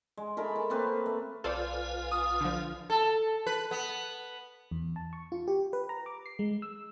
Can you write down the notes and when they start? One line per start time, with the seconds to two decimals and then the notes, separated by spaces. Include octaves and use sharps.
0.17 G#3
0.37 G#3 A3 A#4 B5
0.56 A5
0.70 A3 A#3 C4 B4
1.06 A3
1.44 B1 F4 A4 B4 C5 D5 G#5
2.11 D#6
2.41 D3 F3
2.90 A4
3.47 B4
3.71 B3
4.71 E2
4.96 A5
5.13 C#6
5.32 F4
5.48 G4
5.73 B4
5.89 A#5
6.06 D6
6.26 C7
6.39 G#3
6.62 E6